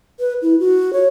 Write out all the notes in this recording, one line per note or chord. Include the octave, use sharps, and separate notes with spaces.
B4
E4
F#4
C#5